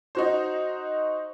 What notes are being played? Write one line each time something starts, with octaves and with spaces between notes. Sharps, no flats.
D#4 F#4 C5